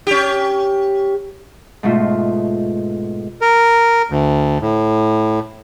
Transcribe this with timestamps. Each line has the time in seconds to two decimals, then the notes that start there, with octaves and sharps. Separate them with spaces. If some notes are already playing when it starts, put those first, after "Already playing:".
0.07 C#4 G4
1.83 G#2 B2 A3 F4
3.41 A#4
4.10 D2
4.62 A2